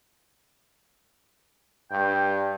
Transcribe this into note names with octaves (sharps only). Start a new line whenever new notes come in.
G2 G5